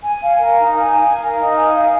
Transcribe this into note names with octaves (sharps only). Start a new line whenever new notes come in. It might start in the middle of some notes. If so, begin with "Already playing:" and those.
G#5
F5
A#4
D#4
G#5
F5
A#4
D#4
G#5
F5